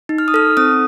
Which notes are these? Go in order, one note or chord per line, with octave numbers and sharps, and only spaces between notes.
D#4
F6
D#6
A4 F6
C4 D#6